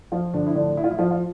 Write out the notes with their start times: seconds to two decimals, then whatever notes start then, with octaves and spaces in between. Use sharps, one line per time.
0.12 F3 F4
0.34 D3 D4
0.46 E4
0.55 A2 D3 D4
0.77 E4
0.84 F4
0.91 E3 E4
0.99 F3 F4
1.11 F4